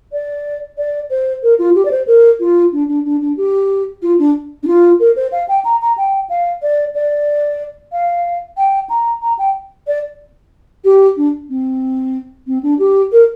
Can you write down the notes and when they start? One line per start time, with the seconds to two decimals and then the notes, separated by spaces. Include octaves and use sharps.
0.12 D5
0.78 D5
1.10 C5
1.43 A#4
1.59 F4
1.75 G4
1.85 D5
1.91 C5
2.07 A#4
2.40 F4
2.72 D4
2.88 D4
3.05 D4
3.21 D4
3.37 G4
4.02 F4
4.19 D4
4.63 D4
4.67 F4
5.00 A#4
5.16 C5
5.32 F5
5.48 G5
5.65 A#5
5.81 A#5
5.97 G5
6.29 F5
6.62 D5
6.95 D5
7.92 F5
8.57 G5
8.89 A#5
9.22 A#5
9.39 G5
9.87 D5
10.84 G4
11.17 D4
11.49 C4
12.47 C4
12.63 D4
12.79 G4
13.12 A#4